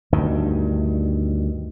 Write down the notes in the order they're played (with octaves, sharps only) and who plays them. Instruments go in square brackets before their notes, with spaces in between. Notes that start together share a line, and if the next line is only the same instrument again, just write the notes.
[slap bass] D2 G2 D#3